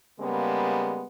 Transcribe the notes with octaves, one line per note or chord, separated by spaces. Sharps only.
C#3 G3 G#3 A#3 B3